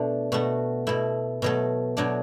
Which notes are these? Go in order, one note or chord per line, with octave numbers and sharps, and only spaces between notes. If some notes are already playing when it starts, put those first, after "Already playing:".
Already playing: B2 A3 D4
B2 A3 F#4
B2 A3 E4
B2 F#3 A3
B2 F#3 A3 D4